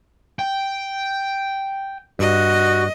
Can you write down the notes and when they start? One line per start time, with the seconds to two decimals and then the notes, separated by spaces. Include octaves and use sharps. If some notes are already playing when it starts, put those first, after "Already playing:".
0.39 G5
2.19 G2 F#4 D#5